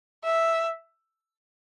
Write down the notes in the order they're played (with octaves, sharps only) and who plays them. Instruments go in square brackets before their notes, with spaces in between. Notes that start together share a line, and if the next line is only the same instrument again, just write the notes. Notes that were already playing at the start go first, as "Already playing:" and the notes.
[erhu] E5